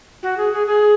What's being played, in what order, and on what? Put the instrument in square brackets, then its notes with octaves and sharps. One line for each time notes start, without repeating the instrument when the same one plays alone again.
[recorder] F#4
G#4
G#4
G#4